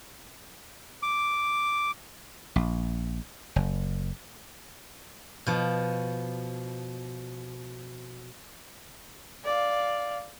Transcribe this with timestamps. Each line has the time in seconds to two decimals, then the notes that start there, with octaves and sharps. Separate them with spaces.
1.03 D6
2.56 A#1
3.56 F#1
5.47 B2 F3
9.45 D5 F5